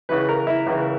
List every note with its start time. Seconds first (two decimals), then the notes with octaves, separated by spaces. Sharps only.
0.09 C#2 C#3 E3 B4
0.29 A#4
0.47 E4
0.67 C#2 C#3 E3